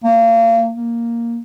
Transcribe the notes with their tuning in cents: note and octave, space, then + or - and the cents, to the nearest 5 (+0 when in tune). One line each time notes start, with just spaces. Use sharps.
A#3 -35
A#3 +0